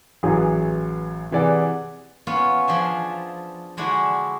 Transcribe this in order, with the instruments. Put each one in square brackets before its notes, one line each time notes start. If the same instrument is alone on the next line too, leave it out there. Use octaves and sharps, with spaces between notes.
[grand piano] A1 E3 F#3 G#4
C3 E3 G#4 D5 F#5
[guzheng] B3 C#4 F4
F3 D4 G#4 E5
D3 G#3 D4 E4 F#4